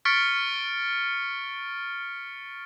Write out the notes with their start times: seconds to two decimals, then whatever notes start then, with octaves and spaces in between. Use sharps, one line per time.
0.05 C#6 F6 A6 B6 C#7 D7